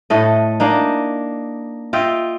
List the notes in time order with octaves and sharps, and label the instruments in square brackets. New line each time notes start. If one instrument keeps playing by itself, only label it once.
[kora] A2 A3 D#5
A#3 D4 D#4
F4 D#5 E5 G5